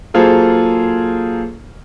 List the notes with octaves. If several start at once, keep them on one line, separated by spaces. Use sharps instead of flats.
F#3 A#3 F4 G#4 A4 C5